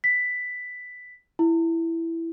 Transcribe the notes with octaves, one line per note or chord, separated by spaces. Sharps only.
B6
E4